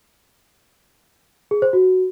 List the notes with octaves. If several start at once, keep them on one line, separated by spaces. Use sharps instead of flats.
G#4
C5
F#4